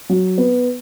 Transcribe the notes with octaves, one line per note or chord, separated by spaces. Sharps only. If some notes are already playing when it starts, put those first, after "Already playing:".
F#3
B3